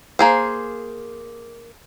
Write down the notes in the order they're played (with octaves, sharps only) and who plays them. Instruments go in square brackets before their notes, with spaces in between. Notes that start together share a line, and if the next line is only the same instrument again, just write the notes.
[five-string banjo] A#3 G#4 C5